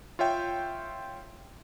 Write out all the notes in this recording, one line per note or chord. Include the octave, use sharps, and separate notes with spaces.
F4 C#5 E5 G5